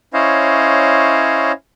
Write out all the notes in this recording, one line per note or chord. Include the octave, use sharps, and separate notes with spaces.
C#4 E4 C5 C#5 D#5 F5